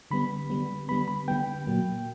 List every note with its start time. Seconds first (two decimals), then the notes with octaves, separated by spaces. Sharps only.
0.11 D3 G3 B3 B5
0.50 D3 G3 B3
0.88 D3 G3 B3 B5
1.08 B5
1.28 D3 G3 B3 G5
1.67 A#2 F#3 A#3